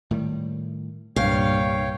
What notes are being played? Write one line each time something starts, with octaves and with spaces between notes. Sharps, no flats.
A2 D#3 G3
C2 G2 A#2 C#5 F5 G5